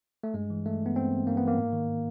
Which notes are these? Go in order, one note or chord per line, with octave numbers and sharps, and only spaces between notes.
A3
G2 G#3
E3
G2 A3
E3
B3
G2 C4
E3
G2 A#3
B3
E3 A#3
G#2
D#3